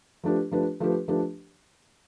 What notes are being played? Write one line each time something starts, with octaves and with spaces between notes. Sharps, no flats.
F3 A3 D4 G4 B4
F3 A3 D4 G4 B4
F3 A3 D4 G4 B4
F3 A3 D4 G4 B4